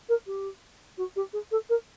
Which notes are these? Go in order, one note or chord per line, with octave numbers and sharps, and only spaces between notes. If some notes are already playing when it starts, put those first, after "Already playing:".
A#4
G4
F#4
G4
G#4
A4
A#4